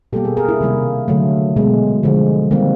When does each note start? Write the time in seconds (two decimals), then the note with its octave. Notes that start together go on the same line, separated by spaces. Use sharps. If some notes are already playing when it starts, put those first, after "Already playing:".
0.13 B2 G3 A#3 G4 A4
0.24 G#4 A#4
0.37 G#4 A#4
0.49 D4 E4
0.60 C3 D#3 G3 A#3
1.08 D3 F#3 A3
1.56 B2 G#3
2.03 D3 F3 G#3
2.51 D#3 G3 A#3 C4